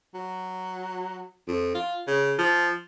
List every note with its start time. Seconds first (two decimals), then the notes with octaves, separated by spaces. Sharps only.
0.15 F#3
1.48 F2
1.75 F4
2.07 C#3
2.39 F3